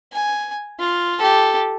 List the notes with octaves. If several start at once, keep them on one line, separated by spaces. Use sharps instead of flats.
G#5
F4
G4 A4